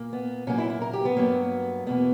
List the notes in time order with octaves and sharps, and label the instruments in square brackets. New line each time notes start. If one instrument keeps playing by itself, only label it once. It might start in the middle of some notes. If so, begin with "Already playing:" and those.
Already playing: [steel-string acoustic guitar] A#2 A#3
B3
A#2 F#3 A#3 C#4
E4
E4
A#4
G4
B3
G2 F#3 A#3
E2 B2 A#3 B3